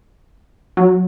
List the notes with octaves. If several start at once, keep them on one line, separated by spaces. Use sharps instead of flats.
F#3